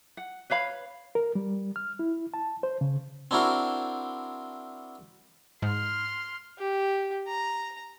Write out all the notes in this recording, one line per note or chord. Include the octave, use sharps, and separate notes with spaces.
F#5
B4 C#5 F5 B5
A#4
G3
F6
E4
A5
C5
C#3
C4 D4 E4 F#4 A#4 C5
G#2 C6 F6
G4
A#5